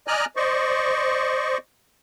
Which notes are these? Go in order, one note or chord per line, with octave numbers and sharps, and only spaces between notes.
D5 D#5 G#5 A#5 F6 F#6
C5 D5 D#5 C#6